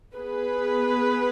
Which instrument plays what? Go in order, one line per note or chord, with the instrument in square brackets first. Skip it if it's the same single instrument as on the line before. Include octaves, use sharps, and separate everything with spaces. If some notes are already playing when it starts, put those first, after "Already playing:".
[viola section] B3 G#4 B4